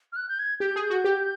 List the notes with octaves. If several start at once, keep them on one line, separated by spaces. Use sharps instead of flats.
F6
F#6
G6
G#6
G4 G6
G#4
G6
F#4
G4